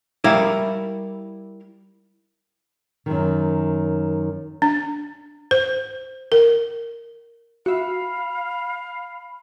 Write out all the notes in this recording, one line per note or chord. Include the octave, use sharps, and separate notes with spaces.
G3 E4 A#4 D5 F5
F#2 D#3
D4
C5
A#4
F#4 E5 F5 B5